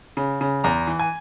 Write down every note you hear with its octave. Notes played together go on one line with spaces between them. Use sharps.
C#3
C#3
E2 A#5
E3
G#5